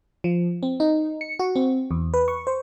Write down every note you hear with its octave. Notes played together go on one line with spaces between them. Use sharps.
F3
C4
D#4
C#7
F#4
C4
E2
B4
C#6
C5